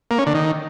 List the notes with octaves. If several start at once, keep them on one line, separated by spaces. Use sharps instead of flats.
A#3
C#4
D3
D#3